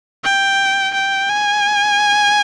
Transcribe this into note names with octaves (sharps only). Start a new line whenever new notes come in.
G5
G5
G#5